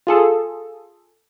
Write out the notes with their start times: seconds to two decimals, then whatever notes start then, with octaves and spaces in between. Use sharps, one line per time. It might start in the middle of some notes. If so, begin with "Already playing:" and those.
0.07 F4 G#4 A4